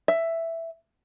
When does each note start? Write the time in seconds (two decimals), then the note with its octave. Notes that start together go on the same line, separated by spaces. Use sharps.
0.08 E5